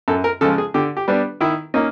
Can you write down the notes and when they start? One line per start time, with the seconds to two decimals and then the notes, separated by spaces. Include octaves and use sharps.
0.08 F#2 A4
0.24 A#4
0.41 C#3 F3 G#3 A4
0.58 G#4
0.74 D3 G4
0.97 G4
1.08 G3 B3 D4
1.41 D#3 E4
1.74 A#3 C#4 D#4